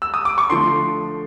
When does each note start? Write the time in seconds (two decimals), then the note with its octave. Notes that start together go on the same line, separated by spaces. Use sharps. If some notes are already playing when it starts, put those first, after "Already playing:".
0.02 E6
0.14 D#6
0.25 D6
0.38 C#6
0.50 D3 F3 A3 C6